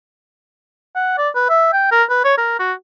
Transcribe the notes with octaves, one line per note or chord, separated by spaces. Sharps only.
F#5
D5
B4
E5
G5
A#4
B4
C#5
A#4
F#4